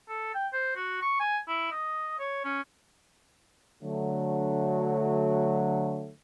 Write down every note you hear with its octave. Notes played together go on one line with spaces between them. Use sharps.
A4
G5
C5
F#4
C#6
G#5
E4
D#5
C#5
C#4
D3 F#3 A3